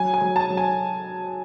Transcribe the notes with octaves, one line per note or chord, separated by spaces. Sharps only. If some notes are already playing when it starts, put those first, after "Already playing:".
Already playing: F#3 G#5
G#5
F#3
A5
F#3
G#5